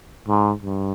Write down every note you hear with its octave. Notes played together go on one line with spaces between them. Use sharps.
G#2
G2